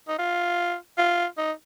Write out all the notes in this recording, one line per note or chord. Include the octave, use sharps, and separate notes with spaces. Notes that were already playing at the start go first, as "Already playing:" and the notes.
D#4
F4
F4
D#4